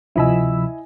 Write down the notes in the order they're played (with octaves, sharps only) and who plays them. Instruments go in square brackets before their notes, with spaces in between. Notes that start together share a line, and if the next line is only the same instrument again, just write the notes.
[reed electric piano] D2 C3 [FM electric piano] F3 B5 E6 [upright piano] E4 D#5 G#5